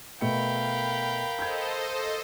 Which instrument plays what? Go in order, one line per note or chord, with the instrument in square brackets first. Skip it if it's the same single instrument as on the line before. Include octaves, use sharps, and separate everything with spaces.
[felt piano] B2 A3 C#7 [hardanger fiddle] A#4 F5 [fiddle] G5 B5
[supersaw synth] A4 C5 D#5 [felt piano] G6 G#6